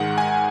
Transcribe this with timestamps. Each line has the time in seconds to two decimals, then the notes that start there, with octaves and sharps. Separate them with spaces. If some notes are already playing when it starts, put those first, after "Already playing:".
Already playing: G#2 D#3 G#3 F#5
0.18 G#5